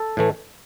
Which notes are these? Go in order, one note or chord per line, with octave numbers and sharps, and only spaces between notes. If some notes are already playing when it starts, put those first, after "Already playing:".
Already playing: A4
A2 E3 A3